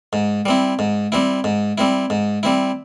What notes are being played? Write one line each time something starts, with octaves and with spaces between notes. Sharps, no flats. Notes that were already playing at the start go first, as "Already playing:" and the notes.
G#2
G3 C4 E4
G#2
G3 C4 E4
G#2
G3 C4 E4
G#2
G3 C4 E4